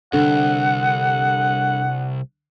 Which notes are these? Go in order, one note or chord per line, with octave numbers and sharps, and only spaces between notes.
C2 D3 F#5